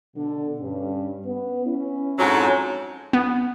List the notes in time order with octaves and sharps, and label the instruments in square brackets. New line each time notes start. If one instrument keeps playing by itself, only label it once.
[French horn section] B2 D3
G2 C#4
B3 B4
C#4 E4
[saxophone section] F2 G#2 F#3
[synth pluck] B3